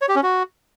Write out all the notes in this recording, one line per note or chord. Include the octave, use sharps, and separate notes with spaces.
C#5
G4
C#4
F#4